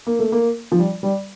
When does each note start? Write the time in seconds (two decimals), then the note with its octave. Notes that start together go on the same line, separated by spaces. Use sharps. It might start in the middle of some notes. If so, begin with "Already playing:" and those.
0.07 A#3
0.19 A3
0.32 A#3
0.72 F3
0.78 G3
1.03 G3